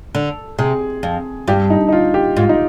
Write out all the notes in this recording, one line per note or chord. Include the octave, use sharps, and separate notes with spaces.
D3
C3 G#4
F2
G2 G4
D#4
D#4
F4
G4
G#2 F4
D#4